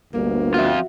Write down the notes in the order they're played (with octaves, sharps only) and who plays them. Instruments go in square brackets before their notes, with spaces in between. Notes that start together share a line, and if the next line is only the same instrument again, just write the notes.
[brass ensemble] G1 D2 [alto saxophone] A#3
[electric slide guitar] F2 F4 [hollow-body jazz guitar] F#4 E5